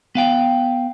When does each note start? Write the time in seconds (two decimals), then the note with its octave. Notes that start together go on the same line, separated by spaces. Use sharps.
0.15 B3 F5 G5